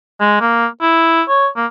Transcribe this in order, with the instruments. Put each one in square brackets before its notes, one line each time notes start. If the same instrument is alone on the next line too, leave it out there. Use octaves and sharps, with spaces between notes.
[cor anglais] G#3
A#3
E4
C#5
A#3